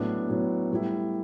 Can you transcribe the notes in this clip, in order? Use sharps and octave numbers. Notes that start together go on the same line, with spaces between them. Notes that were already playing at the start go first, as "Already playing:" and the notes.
Already playing: A2 F#3 B3 D4
A2 F#3 B3 D4
A2 G3 B3 E4